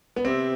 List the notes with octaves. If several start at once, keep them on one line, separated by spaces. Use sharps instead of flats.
B3
C3 C4